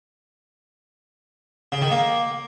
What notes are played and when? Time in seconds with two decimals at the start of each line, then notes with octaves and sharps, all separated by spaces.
1.72 C#3
1.82 D#3
1.91 A#3